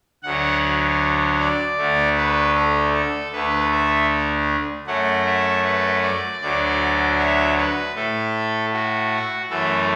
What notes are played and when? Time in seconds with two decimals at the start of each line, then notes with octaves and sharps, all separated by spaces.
0.23 D2 D3 F#3 F#5
1.40 D5
1.78 D2 D3 A3
2.17 B4
2.55 A4
2.94 A4
3.32 D2 D3 A3 B4
3.72 E5
4.87 F#2 F#3 A3 F#5
5.26 E5
5.65 B4
6.02 D5
6.41 D2 D3 F#3 D5
7.19 E5
7.57 B4
7.95 A2 A3 A4
8.73 F#4
9.50 F#2 E3 A3 A4